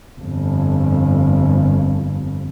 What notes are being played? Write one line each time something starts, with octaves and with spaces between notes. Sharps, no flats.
G1 F2